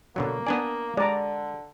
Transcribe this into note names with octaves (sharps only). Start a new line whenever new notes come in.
B2 D3 F#3 A#3
B3 D4 D5 G#5 D#6
D3 G#3 D5 A#5